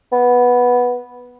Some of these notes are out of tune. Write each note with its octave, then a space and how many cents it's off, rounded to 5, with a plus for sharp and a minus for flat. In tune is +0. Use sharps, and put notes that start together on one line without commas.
B3 -5